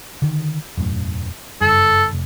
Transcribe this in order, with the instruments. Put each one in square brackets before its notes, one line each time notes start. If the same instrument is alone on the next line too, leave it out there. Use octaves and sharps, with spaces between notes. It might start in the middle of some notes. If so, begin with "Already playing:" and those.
[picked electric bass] D3 D#3
E1 F#2 A2
[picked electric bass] F#1 G2 [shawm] A4
[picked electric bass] F1